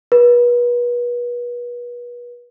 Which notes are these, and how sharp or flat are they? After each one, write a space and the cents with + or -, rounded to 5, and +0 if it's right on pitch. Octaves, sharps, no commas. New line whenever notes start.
B4 -35